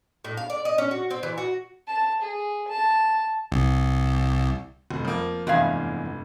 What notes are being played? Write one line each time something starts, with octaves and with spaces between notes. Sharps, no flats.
A2
F5
D5
D#5
C#4
F#4
C4
E3
F#4
A5
G#4
A5
C2
F1
F3 A#3
F1 E2 G2 G#3 F5 G#6